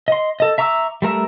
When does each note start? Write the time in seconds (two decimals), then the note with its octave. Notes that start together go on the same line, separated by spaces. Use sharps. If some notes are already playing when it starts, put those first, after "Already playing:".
0.08 D#5 C6
0.40 A4 D#5
0.58 E5 A#5 C#6 D6 E6
1.02 G3 A3 A#4 E5